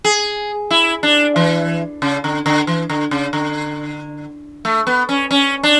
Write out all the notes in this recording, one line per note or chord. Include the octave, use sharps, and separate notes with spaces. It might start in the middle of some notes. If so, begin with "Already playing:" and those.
G#4
E4
D4
E3
C#3
D3
D3
E3
D3
C#3
D3
A3
B3
C#4
C#4
D4